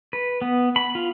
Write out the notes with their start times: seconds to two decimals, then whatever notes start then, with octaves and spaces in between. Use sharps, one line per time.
0.13 B4
0.42 B3
0.76 B5
0.95 F4